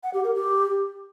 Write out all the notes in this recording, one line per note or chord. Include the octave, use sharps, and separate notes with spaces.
F#5
G4
A#4
G4